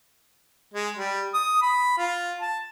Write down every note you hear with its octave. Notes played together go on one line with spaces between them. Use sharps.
G#3
G3
D#6
B5
F4
A5